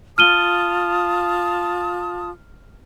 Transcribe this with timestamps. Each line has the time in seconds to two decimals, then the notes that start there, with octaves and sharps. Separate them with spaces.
0.18 F4 A5 D#6 F6 D#7 G7